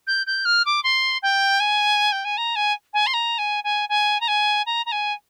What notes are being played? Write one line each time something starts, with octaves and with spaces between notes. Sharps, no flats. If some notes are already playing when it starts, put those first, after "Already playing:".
G6
G6
F6
D6
C6
G5
G#5
G5
G#5
A#5
G#5
G#5
C6
A#5
G#5
G#5
G#5
A#5
G#5
A#5
A#5
G#5